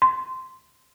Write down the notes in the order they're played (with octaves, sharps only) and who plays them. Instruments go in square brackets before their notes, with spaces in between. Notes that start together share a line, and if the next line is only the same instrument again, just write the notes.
[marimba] C6